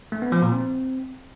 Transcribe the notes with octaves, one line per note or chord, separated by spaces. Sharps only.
A3
B3
F3
A#2
C4